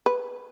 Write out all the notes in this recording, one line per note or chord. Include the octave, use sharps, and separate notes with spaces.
B4